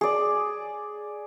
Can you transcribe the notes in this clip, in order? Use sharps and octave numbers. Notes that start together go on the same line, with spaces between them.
G#4 D5